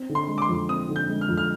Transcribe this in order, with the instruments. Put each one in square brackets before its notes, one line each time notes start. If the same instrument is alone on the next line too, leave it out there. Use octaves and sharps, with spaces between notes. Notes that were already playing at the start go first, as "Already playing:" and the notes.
Already playing: [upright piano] C4
D3
[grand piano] C6
[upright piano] G#3
[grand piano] D6
C6
[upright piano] F2
[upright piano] C4 [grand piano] D#6
[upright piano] D3
[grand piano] G6
[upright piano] G#3
[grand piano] F6
[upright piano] F2
[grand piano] F6